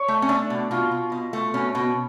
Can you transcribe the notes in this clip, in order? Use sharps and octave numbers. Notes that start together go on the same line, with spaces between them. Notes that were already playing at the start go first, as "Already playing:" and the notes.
Already playing: C#5
A3
C#4
A3 D4
B2
B2 F4
B2
B2
A3
B2 C#4
B2